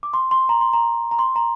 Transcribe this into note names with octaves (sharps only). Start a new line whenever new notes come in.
D6
C6
C6
A#5
C6
A#5
A#5
C6
A#5